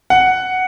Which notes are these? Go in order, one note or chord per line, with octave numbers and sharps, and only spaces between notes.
F#5